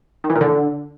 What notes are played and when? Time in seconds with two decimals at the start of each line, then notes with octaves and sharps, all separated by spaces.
0.24 D#3
0.30 E3
0.35 A#2
0.41 D3